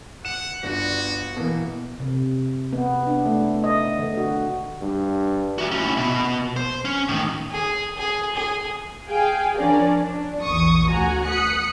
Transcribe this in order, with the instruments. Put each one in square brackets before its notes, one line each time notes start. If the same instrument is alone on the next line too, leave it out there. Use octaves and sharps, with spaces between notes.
[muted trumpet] F#5 [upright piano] E7
[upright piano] G1 D4 [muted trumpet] F#4
[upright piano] B2 E3 A#3
[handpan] C3
B3
D4
A3
D#5
D3
F#4
[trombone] G2
[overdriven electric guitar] F#4 E5
C#4 E4
B2 B3
C5
C#4
A2 D#3
[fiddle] G#4
G#4
G#4
[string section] G#4 F5 G5 G#5
F3 C#4 D4 A#4 D5
D4
A#1 E2 C#6 D#6
D2 F#4 F#5 G#5 A#5
D#6 F#6 B6 C#7